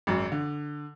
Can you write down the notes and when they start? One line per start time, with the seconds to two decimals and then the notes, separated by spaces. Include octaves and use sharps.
0.07 G#1 F#2
0.32 D3